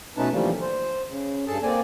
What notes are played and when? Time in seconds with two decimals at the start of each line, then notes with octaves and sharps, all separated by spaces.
0.17 B2 A3 C#4 D#4 B4 A5
0.32 D3 E3 F3 G3 A3 A#3
0.61 C5
1.08 C#3
1.47 G2 G#4 A4 A5
1.63 A#3 C4 D5 G#5